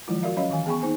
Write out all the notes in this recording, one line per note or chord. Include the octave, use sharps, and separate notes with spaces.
D#3 F3 F#3 G#3 E4 F4
F#4 A#4 D5 E5 F5
F#3 C#4 C#5 D#5 F5 B5
D#3 E3 F5 G#5
B3 G#4 G5 G#5 B5 C#6
A#3 D#4 C5 G#5